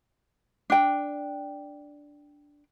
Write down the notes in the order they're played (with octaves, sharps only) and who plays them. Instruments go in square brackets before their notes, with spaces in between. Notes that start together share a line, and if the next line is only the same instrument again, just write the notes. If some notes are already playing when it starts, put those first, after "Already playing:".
[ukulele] D4 G5